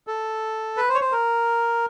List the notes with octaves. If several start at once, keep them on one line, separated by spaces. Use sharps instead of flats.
A4
B4
C5
C#5
C5
A#4